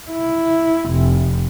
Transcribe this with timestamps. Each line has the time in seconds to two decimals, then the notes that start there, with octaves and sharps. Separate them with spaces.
0.11 E4
0.90 F1